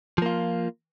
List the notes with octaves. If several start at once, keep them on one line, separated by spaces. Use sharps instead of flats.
F3 A#3 F4